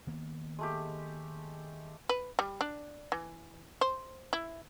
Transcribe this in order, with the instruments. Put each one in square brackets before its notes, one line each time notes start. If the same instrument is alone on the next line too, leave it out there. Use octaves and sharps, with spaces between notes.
[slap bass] D#3 A#3 B3
[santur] G#3 A3 G4
[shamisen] B4
G3
D4
E3
C5
E4